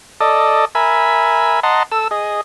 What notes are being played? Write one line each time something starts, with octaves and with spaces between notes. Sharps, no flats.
A4 D5 D#5
A#4 E5 G#5 B5
D#5 F#5 A5 A#5 C6
A4 E6
G#4 D#5